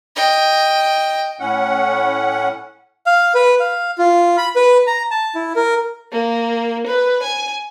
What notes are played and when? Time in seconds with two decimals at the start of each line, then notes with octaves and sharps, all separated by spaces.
0.16 D#5 G5
1.40 A2 C#4 F#5
3.06 F5
3.35 B4
3.60 F5
3.98 F4
4.38 B5
4.56 B4
4.87 A#5
5.11 A5
5.35 E4
5.56 A#4
6.12 A#3
6.87 B4
7.23 G#5